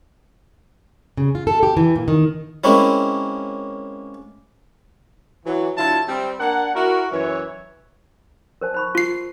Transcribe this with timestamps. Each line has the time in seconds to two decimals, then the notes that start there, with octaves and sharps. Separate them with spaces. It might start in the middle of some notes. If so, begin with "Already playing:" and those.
1.17 C#3
1.35 F4
1.47 A4
1.63 G4
1.77 E3
1.96 A#2
2.08 D#3
2.64 G#3 A#3 C4 C#4 E4
5.45 E3 F#3
5.77 D3 F#3 E4 F4 C#5 A5
6.08 G3 C4
6.40 A#3 D4 A#4 F#5
6.74 E4 F#4 A#4
7.12 F#2 E3 C#5
8.61 A#4 C5 A5
8.74 C5 B5 C#6
8.95 F4 C7